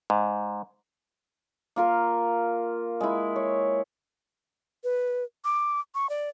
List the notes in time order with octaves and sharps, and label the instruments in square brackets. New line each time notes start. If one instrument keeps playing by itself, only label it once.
[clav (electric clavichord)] G#2
[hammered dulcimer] A#3 F4 A#4
G#3 E4
C#5
[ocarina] B4
D6
C#6
D5